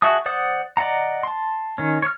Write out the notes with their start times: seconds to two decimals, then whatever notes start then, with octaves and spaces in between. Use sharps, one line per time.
0.02 F#4 G#4 E5 A5 D#6
0.26 C5 D5 F#5 D#6
0.77 D5 D#5 F#5 A#5
1.23 A5 C6
1.78 D#3 C#4
2.02 C#5 F6